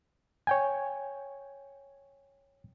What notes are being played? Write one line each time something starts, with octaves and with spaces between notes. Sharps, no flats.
C#5 G5 G#5